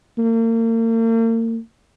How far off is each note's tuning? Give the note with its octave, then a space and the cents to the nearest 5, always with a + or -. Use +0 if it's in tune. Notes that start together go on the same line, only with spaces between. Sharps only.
A#3 -40